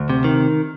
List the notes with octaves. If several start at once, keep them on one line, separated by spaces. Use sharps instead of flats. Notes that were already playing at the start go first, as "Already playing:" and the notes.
Already playing: D2
C3
D#3